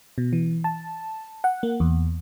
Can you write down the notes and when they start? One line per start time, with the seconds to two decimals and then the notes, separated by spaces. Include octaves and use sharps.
0.18 B2
0.33 E3
0.64 A5
1.44 F#5
1.63 A#3
1.80 E2